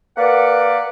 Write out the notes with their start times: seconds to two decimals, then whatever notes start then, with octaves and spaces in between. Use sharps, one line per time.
0.17 A#3 B4 D5 F#5